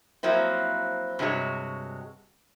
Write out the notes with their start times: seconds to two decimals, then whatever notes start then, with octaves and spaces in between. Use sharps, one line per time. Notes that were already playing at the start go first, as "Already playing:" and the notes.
0.23 F3 F#3 A#3 C4 E4
1.19 G2 C3 G#3 F#4 C#5